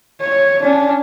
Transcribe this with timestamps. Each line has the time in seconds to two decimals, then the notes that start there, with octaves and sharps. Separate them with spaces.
0.22 C#5
0.63 C#4 D4